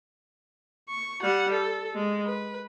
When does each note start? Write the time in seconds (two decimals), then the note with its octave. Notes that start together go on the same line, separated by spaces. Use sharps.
0.89 C#6
1.22 G3 F#5
1.52 A4
1.94 G#3
2.25 B4